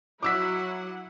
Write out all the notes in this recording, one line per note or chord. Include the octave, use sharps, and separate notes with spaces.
F#3 E4 F#5 D6 E6 B6